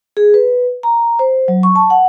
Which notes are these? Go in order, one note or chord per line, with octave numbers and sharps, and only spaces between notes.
G#4
B4
A#5
C5
F#3
C#6
A5
F#5